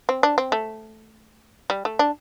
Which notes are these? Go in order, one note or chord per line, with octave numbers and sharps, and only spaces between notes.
C4
D4
C4
A3
G3
A3
D4